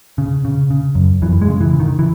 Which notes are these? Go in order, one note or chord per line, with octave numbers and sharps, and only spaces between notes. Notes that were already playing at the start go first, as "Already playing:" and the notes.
C#3
C#3
C#3
F#2
F#2 E3
G#3
C#3
E3
C#3
D#3
E3